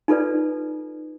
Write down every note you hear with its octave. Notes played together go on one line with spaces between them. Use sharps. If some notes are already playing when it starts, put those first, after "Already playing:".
D#4 F4 A4 B4 D5